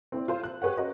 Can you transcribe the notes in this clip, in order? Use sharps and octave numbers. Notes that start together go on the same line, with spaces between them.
C4 E4 C5 D5
F4 C5
F#6
G4 G#4 B4 C#5 F#5
C#4 F#4 A#4 C5 D#5